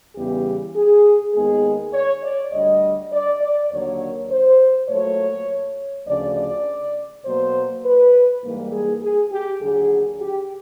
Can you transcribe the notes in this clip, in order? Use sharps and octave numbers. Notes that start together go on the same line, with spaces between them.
E2 C#3 E3 G3 B3 G4
G#4
D#2 D#3 G#3 B3 G#4
C#5
D5
D2 D3 G3 D#5
D5
D5
D#2 D3 F#3 A#3 C#5
C5
A#2 F#3 A3 C#5
D2 C#3 F3 D5
D5
B2 F#3 A#3 C5
B4
G#2 E3 G3 A#3
G#4
G#4
G4
D#2 D3 F#3 G#4
G4